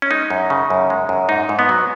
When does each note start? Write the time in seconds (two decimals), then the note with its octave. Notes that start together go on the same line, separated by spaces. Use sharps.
0.02 C#4
0.11 G#3 D#4
0.30 F#2
0.50 C#3
0.70 F#2
0.90 G#3
1.09 F#2
1.29 G#2 D#4
1.49 G#2
1.59 B3
1.69 F#3